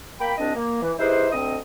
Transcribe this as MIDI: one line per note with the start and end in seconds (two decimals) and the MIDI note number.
0.20 0.32 58
0.20 0.32 79
0.20 0.32 83
0.38 0.52 36
0.38 0.52 60
0.38 0.52 62
0.38 0.52 75
0.54 0.80 58
0.82 0.93 52
0.98 1.28 63
0.98 1.28 64
0.98 1.28 67
0.98 1.28 68
0.98 1.28 71
0.98 1.28 72
1.32 1.57 38
1.32 1.57 60
1.32 1.57 75
1.32 1.57 87